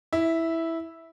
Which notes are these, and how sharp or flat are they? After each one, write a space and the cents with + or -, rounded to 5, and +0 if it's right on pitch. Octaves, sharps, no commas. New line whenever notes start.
E4 -5